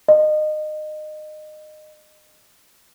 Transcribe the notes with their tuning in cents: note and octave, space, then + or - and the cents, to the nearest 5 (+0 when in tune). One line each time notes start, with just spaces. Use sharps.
D#5 -25